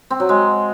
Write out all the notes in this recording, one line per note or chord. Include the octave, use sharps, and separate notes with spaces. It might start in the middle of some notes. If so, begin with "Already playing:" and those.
C4
F#3
G#3